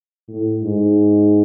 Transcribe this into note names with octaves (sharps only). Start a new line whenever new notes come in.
A2
G#2